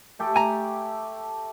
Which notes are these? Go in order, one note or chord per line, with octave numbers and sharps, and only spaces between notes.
A3 G4 A4
G#5 A#5